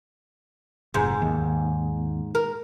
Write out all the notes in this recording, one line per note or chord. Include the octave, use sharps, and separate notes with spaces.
F1 G#2
D#2
A#4